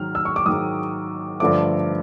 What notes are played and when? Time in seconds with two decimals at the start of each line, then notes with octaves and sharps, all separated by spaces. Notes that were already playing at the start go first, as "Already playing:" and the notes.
Already playing: G#2 D#3 F#3 F6
0.15 E6
0.25 C#6
0.36 D6
0.46 G#2 D#3 F#3 D#6
1.40 G2 D3 F3 A3 D6